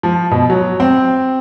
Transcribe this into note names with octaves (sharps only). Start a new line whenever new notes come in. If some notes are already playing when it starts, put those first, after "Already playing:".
F3
B2
F#3
C4